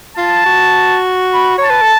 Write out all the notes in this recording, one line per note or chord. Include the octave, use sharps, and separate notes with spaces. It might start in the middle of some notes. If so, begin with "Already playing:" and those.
F4 A5
F#4
B5
C#5
A5
B4
A4